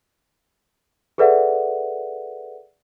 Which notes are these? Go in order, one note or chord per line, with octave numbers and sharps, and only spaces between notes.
G#4 A4 B4 D5 E5 F#5